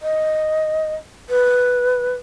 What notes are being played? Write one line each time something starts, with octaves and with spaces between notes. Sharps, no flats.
D#5
B4